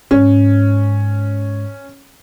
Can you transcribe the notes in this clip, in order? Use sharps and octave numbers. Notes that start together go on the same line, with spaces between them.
G#2 C#4